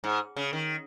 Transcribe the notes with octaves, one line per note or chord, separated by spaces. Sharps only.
G#2
C#3
D#3